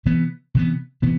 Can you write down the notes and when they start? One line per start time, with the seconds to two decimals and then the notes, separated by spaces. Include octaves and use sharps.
0.06 C3 E3 B3
0.55 C3 E3 B3
1.02 C3 E3 B3